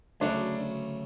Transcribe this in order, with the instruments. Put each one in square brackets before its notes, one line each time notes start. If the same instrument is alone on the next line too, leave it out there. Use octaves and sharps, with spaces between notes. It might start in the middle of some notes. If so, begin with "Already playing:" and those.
[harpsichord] D2 C#3 F#3 A3 [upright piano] D4